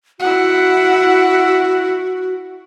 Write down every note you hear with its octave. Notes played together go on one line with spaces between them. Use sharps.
E4 F#4 F#5